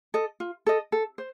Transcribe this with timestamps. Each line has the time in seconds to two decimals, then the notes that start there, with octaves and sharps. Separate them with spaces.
0.14 A4 D#5
0.40 F4
0.66 A4 D#5
0.92 A4
1.18 C5